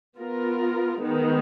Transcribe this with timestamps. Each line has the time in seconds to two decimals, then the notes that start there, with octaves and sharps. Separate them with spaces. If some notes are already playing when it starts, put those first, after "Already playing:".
0.18 B3 F4 A#4
1.01 D#3 G#3 B3